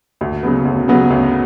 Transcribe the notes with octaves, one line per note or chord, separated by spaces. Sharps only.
D2
C#3 F#3 B3
D2
C#3 F#3 B3
D2